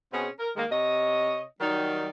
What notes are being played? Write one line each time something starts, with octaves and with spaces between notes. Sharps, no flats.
B2 C4 C#4 G#4
A#4
D#3 G#3 A#3
C3 C#5 D#5
D#3 F#3 G3 D#4 D5